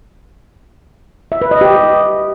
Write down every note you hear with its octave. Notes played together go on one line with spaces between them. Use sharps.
E5
B4
D#5
G4